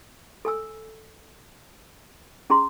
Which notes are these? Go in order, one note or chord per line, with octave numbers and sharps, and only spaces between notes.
A4 G#5 E6
C#4 G#4 A#5 C6